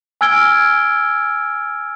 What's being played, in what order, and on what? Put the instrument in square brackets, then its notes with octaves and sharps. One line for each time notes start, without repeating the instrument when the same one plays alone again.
[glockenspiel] G#5 E6 F6 G#6 D7 G7